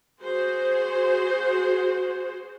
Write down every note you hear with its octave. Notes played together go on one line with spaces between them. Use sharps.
F#4 G#4 C5